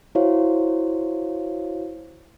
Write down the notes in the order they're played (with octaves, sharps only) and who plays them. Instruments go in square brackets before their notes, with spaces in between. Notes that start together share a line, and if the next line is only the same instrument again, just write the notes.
[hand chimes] E4 F#4 C5 C#5 F5